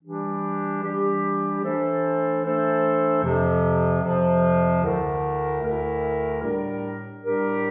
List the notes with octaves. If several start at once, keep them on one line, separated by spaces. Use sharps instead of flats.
E3 G3 D4 G4
E3 G3 D4 G4
E3 A3 D4 A4 C5
E3 A3 D4 A4 C5
F2 C3 F3
F2 C3 F3
D2 D3 A3 E4 A#4
D2 D3 A3 E4 A#4
A2 G3 D4 G4 A#4
A2 G3 D4 G4 A#4